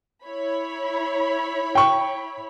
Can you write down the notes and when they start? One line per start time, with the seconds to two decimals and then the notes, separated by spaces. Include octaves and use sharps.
0.24 E4 C#5 B5
1.75 G5 C#6